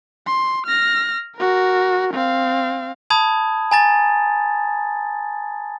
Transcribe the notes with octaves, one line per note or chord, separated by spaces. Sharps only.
C6
F6 A#6
F#4 A#4
C4 F5
A5 B5 D#6 G#6
G#5 A#5 A6